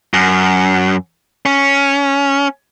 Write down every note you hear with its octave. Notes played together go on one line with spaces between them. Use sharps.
F#2
C#4